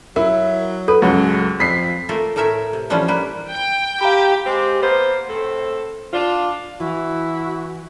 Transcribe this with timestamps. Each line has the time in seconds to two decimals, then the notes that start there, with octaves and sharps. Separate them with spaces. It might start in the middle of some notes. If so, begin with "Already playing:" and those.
0.16 F#3 E4 A#4
0.88 A4 B4
1.02 C#2 F#2 A2 F#3
1.59 F2 B5 B6 C7
2.09 A3 A#3 F4 A4 A#4
2.36 A2 A3 A#4 C#5 E5
2.73 C3
2.90 E3 F3 G3 C#4 D4 F4
3.08 E3 G3 A#3 B4
3.48 G5
4.01 G4 F5 A#5 B5
4.45 G#3 C4 G4
4.82 A#3 B3 C5
5.28 A2 C4 A4
6.13 D4 F4
6.80 E3 E4 F#4